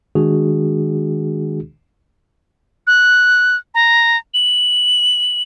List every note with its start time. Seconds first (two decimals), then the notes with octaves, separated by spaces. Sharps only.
0.15 D#3 G#3 D4 F#4 G#4
2.87 F#6
3.74 A#5
4.34 F#7